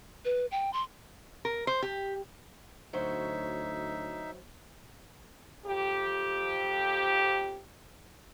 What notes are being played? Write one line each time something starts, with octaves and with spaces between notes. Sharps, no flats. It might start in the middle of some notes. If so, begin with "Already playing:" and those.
B4
G5
C6
A#4
C5
G4
D2 F#3 D#4 C5 C#5 E5
F2 G4